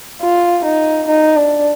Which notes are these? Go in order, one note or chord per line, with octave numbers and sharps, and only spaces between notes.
F4
D#4
D#4
D4